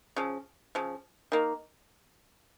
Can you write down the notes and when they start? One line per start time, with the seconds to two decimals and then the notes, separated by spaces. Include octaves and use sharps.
0.16 C#3 F3
0.75 C#3 F3
1.32 D#3 A#3